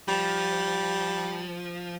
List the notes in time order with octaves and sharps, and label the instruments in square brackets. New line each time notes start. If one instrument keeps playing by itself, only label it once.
[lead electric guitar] F3 [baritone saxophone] G3